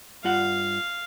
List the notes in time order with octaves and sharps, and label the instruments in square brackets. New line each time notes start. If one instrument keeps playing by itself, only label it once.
[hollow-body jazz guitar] G2 F4 F#5 [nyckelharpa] F5